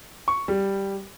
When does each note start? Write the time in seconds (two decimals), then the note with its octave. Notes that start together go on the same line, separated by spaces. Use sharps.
0.28 C#6
0.48 G3